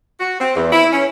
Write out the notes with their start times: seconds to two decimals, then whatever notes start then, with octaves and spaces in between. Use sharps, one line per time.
0.20 F#4
0.40 C4
0.56 E2
0.72 E4
0.92 C#4